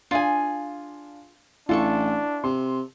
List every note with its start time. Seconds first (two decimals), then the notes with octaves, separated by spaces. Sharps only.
0.11 D4 F4 G#4 F5 G#5
1.69 A1 D4 E4 F4 A4 C#6
2.44 C3 C6